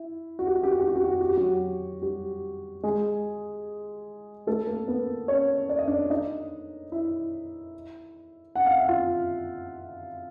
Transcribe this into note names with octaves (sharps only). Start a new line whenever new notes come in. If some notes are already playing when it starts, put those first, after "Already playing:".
Already playing: E4
F#4
G4
F#4
G4
F#4
G4
F#4
G4
F#4
G4
F#4
G4
F#3 F#4
G3 G4
G#3 G#4
A3 A4
A#3 A#4
B3 B4
C#4 C#5
D5
D#5
D4 D5
D#4 D#5
E4 E5
F#5
F5
E5
F4 F5